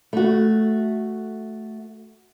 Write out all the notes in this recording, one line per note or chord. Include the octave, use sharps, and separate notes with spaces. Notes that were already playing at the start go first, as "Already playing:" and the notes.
A3 F#4